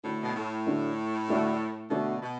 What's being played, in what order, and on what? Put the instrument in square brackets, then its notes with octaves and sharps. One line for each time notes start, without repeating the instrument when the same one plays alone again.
[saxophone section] A2 [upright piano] D3 A3 D4 F#4
[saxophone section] B2
A2
[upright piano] D3 A3 D4 F#4
D3 A3 D4 F#4
[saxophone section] B2 [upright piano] D3 A3 D4 F#4
[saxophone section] B2